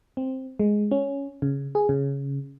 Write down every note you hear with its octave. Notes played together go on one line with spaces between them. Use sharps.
C4
G#3
C#4
C#3
G#4
C#3